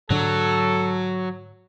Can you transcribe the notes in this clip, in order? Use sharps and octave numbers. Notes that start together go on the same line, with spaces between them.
G#2 D3 F#3 D4 A4